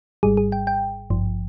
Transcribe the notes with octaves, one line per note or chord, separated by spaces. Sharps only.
G#1 G#2 G3 G#4
G#4
G5
G5
G#1 G2 F3